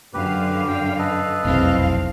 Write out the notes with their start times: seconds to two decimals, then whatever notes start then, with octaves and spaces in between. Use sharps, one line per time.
0.14 F#2 D3 G4 B4 F5
0.68 G5
0.99 A4 B4 D#5
1.45 F1 B1 E2 C4 F5